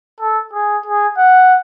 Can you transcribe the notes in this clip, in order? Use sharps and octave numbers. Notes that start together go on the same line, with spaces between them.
A4
G#4
G#4
F#5